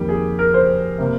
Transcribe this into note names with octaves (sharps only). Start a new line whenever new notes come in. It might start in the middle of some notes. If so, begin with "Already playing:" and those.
Already playing: F2 D#3 G3 A#3 G4
G#4
A#4
C5
C3 G3 A#3